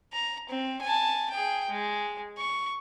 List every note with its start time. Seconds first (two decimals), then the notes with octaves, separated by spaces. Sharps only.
0.13 A#5
0.49 C4
0.82 G#5 A5
1.30 G#4 G5
1.69 G#3
2.38 C#6